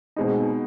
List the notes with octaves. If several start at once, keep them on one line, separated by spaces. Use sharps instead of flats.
B2 G#3 C4 D#4